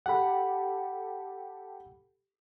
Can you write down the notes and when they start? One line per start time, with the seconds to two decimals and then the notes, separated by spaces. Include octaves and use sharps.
0.06 G4 A4 F#5 B5